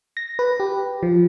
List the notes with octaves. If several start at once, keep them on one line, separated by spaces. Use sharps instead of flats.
A#6
B4
G4
F3